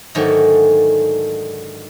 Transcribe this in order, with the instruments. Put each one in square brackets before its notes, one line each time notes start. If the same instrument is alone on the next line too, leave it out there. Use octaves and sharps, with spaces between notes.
[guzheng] G#2 D3 D#3 F#3 G#3 A3